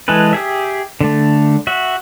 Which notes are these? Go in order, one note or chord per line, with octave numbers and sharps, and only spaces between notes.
E3 G#3 G#4 A4 B4
G4 G#4 E5
D3 A3
F#4 E5